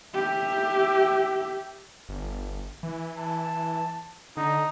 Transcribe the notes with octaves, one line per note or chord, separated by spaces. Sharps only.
G4 E5
G1
E3
A5
D3 D#4